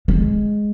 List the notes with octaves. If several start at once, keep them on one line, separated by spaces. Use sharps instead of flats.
G#3